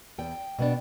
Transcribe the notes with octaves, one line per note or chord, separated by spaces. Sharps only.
E2 G5
B2 B3 D4